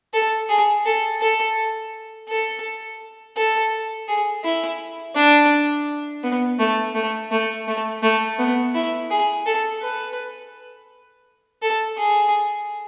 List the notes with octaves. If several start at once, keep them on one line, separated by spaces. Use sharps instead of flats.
A4
G#4
A4
A4
A4
A4
G#4
E4
D4
B3
A3
A3
A3
A3
A3
B3
E4
G#4
A4
B4
A4
G#4